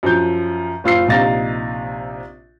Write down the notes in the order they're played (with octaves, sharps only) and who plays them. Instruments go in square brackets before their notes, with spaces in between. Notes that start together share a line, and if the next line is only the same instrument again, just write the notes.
[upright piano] F#2 F3 G6
F#1 F4 E6 C7
A#1 C3 D#4 F5 A6 A#6